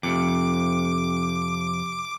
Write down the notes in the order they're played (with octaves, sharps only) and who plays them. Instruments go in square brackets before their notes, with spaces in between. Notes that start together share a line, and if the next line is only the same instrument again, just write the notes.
[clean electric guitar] F2 C3 [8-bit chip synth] D6